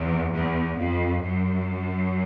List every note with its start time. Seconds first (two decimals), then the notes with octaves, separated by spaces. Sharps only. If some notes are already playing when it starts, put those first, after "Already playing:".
Already playing: E2
0.31 E2
0.77 F2
1.23 F#2